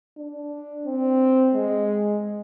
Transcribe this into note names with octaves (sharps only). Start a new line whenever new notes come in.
D4
C4
G#3